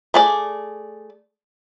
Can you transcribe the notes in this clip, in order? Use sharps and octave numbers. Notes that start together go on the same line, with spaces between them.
A3 G#4 D5